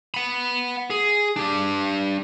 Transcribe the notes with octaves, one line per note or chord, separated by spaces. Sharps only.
F#5 B5
G#4
D4 G4